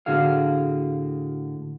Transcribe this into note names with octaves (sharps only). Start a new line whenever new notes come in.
A2 D3 F#4 G#4 F5